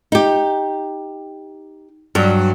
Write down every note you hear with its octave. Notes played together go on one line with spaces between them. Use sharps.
D#4 G4
G2 F#3